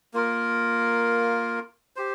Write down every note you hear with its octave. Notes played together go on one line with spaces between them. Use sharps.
A#3 F4 A#4
G4 C5